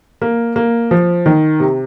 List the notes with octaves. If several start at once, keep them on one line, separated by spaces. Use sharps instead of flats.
A#3
A#3
F3
D#3
C3